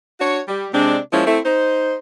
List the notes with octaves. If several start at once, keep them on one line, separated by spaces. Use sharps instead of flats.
D4 F#4 C#5
G3
C3 G#3 C4 D4
F3 G#3 A#3 C#4 E4
A3 C4 E4
D#4 C5